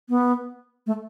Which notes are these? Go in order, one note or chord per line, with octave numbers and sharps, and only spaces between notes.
B3
A3